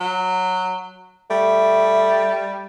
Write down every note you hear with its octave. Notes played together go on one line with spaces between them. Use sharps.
F#3
G3 A3